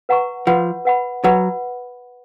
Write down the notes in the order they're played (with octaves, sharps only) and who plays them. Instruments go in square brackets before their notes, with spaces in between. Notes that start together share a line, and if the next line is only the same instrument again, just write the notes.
[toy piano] B4 F#5 A#5 C#6
[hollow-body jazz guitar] F3 [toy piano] B4 F#5 B5
[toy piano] B4 F#5 B5
[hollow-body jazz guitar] F#3 [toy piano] B4 F#5 B5